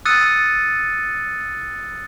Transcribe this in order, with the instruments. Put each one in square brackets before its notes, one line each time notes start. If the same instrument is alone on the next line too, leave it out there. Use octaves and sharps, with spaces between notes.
[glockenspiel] D#6 E6 F#6 A6 C#7 D#7